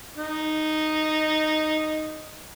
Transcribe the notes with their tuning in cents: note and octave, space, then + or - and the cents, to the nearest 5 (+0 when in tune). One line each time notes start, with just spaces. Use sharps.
D#4 -5